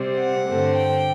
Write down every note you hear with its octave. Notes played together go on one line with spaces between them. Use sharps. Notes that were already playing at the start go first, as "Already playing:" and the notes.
Already playing: C3 G3 C4
F#5
G2 D3 A3 C4
G5